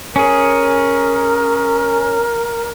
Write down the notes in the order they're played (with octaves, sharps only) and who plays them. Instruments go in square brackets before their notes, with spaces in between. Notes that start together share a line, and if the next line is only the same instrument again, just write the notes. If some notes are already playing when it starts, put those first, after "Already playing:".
[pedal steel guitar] C#4 G#4 [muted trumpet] A#4